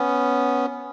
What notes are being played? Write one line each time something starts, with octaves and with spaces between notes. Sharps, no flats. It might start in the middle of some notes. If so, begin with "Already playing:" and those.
Already playing: B3 C#4